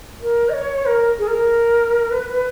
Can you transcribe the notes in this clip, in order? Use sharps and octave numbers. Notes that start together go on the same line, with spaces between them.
A#4
D#5
C#5
A#4
G#4
A#4
B4
B4